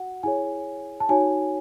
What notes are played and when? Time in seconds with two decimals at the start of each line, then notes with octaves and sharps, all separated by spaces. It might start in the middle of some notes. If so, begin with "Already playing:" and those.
Already playing: F#4 F#5
0.23 E4 G#4 C#5 G#5
1.00 A5
1.09 D#4 F#4 C#5 G#5